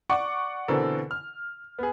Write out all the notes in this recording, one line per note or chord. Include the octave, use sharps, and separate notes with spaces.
D5 F#5 C#6 D6
B2 D3 E3 C4 A4 A#4
F6
B3 G#4